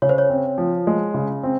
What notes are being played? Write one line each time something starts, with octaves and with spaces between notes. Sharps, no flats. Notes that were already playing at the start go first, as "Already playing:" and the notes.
C#3 C#5
C5
C#5
C4
F3
G#3
C#3
C4